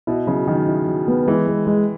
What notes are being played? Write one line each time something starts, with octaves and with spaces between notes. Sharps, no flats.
B2 E4
C#3 F#3
D#3 F#3
E4
F#3
B3
E3 G#3
G#3
G#3